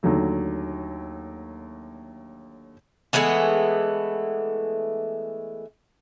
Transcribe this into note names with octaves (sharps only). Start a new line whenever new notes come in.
D#2 D3 F#3 A3
E3 G#3 A3 B3